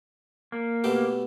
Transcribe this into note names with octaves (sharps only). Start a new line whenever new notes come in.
A#3
B2 A3 G4